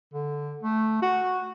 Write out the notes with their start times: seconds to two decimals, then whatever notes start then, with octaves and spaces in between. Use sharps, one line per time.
0.14 D3
0.62 A3
1.02 F#4